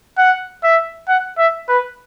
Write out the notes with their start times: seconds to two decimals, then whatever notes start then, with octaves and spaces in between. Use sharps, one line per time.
0.18 F#5
0.64 E5
1.08 F#5
1.38 E5
1.69 B4